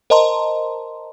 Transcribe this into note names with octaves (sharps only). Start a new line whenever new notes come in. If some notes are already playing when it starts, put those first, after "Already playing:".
A#4 C5 D#5 A5 A#5 C6